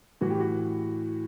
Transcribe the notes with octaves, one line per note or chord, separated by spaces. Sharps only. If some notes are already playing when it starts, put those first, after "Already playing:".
A2 E3 F#4
G4
F#4